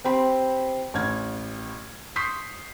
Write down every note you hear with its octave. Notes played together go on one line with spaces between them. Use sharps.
C4 G4 G5 B5 C6
A1 F6 G#6
C6 C#6 D#6 G6 B6 C7